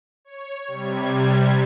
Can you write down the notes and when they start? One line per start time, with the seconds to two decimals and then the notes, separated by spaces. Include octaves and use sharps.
0.25 C#5
0.67 C3 G3 G#6